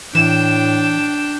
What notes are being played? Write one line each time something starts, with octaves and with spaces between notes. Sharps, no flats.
A2 E3 D4 G5 E7